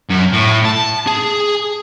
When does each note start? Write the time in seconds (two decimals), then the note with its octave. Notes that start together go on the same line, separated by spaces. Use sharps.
0.09 F#2
0.33 A2
0.65 A5
1.07 G#4